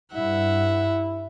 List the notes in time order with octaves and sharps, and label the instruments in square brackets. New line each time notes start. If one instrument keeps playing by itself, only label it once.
[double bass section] G2 [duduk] E4 [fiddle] E5 F#5